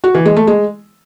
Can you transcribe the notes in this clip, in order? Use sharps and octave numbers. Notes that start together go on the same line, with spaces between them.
F#4
E3
G#3
A3
G#3